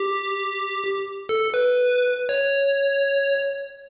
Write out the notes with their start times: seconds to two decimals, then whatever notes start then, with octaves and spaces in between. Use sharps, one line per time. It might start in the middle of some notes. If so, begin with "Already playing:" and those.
Already playing: G4
1.29 A4
1.54 B4
2.29 C#5